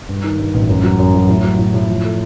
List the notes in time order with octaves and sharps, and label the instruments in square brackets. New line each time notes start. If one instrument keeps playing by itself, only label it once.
[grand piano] G2
D#3
G2
A1
F#2
F#3
F#2
F#3
A2
F#3
A2
A2
F3
A3